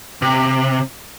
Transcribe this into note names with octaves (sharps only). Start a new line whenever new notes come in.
C3